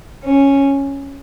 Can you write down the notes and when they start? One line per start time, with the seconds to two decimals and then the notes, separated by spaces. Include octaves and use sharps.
0.23 C#4